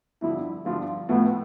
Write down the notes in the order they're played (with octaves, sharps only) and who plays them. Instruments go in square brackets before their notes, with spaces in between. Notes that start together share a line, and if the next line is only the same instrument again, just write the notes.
[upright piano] G2 D3 F3 [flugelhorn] E4
[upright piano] G2 D3 F3 [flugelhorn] F4
[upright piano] A2 F3 A3 [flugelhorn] B3